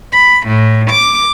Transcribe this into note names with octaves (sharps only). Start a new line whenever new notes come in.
B5
A2
D6